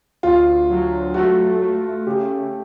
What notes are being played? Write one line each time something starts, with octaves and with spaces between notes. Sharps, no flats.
D2 F4
F#3
A3 F#4
A3
C#3 G4